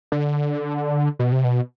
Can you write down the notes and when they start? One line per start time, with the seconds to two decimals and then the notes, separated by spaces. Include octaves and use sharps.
0.12 D3
1.19 B2
1.32 C3
1.44 B2